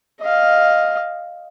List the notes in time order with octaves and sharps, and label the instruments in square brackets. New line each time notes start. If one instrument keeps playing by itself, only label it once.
[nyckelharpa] D#5 F5